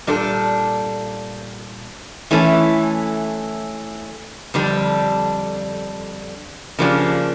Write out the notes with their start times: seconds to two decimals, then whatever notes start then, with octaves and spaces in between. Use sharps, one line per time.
0.07 A#2 G3 D4 A4
2.31 E3 A3 C#4 E4 A4
4.54 F2 D3 G3 D4
6.79 C#3 F3 A#3 D4 G4